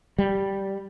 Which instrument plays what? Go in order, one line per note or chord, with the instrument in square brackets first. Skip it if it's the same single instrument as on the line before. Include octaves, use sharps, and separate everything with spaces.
[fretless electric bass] G3